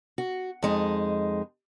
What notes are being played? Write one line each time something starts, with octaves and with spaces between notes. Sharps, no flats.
F#4
F2 G#3 D#4